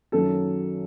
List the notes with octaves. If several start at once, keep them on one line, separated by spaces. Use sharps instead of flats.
F#2 D#3 F#3 A4